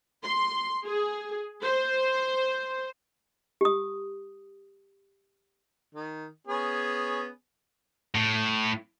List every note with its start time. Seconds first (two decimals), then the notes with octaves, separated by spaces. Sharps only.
0.23 C6
0.85 G#4
1.62 C5
3.61 G4 D#6
5.95 D#3
6.47 B3 C#4 G#4
8.15 A2